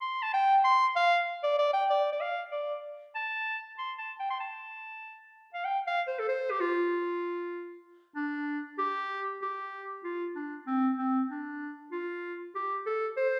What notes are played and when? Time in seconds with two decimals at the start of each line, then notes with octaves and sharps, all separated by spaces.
0.01 C6
0.22 A5
0.33 G5
0.64 C6
0.96 F5
1.43 D5
1.58 D5
1.73 G5
1.90 D5
2.12 D5
2.20 F5
2.52 D5
3.15 A5
3.78 C6
3.98 A5
4.19 G5
4.30 C6
4.40 A5
5.54 F5
5.65 G5
5.87 F5
6.07 C5
6.19 A4
6.29 C5
6.51 G4
6.60 F4
8.15 D4
8.78 G4
9.42 G4
10.04 F4
10.35 D4
10.67 C4
10.98 C4
11.29 D4
11.91 F4
12.55 G4
12.86 A4
13.17 C5